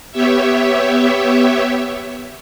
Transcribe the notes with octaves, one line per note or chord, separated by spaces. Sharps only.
B3 G4 C#5 E5